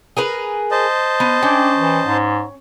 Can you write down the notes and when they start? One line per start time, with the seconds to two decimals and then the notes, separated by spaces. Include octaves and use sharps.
0.17 G#4 A#4 B4
0.71 C5 D#5 A5
1.20 B3
1.42 C#4 D4 G5
1.77 E3
2.06 G#2